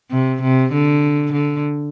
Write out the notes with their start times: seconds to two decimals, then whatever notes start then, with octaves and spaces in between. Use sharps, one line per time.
0.11 C3
0.42 C3
0.73 D3
1.33 D3